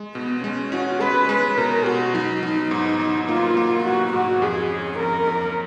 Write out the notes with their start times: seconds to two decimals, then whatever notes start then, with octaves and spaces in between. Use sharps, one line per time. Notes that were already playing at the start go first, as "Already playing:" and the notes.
Already playing: G#3
0.15 B2 B3
0.44 G#3 C#4
0.72 C#4 F#4
1.01 G#3 B4
1.29 G#3 B4
1.58 B2 A#4
1.85 B2 F#4
2.14 F#3 D#4
2.42 F#3 D#4
2.71 G#2
3.00 F#3
3.28 A#3 F4
3.57 A#3
3.85 F#3 F#4
4.13 G#2 F#4
4.42 F2 G#4
4.70 C#4
4.99 F2 A#4
5.27 F2